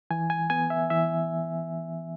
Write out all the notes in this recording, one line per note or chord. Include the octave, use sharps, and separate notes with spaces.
E3 G#5
G#5
B3 G#5
E5
E3 E5